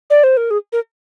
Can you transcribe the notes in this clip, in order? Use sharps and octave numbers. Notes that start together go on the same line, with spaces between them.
D5
C5
A#4
G#4
A#4